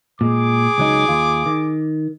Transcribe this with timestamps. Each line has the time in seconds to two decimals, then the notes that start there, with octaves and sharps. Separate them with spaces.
0.21 A#2 G#3 G#4 D6
0.78 C#2 F#3 D#4
1.08 D#2 F4
1.46 D#3